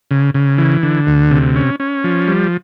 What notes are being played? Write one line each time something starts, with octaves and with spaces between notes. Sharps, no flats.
C#3
C#3
E3
D3
D2
C3
C#4
C#4
F3
G3